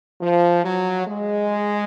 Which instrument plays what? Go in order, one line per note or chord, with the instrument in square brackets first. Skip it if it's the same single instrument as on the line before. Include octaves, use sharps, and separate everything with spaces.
[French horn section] F3
F#3
G#3